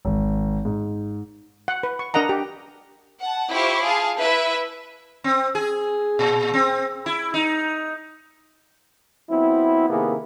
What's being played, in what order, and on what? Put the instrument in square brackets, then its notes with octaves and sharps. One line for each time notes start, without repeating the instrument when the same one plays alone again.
[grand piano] G#1
G#2
[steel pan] F#5
B4
C#6
D4 A#4 D#5 F#5 A#5
G4
[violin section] F#5 A5
E4 F4 G4 C5 C#6 D6
F4 G#4 F5 A5
E4 B4 E5
[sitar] C4
G#4
A#2
C4
E4
D#4
[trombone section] F#3 B3 C4 E4
C3 D#3 A#3 B3 E4 G#4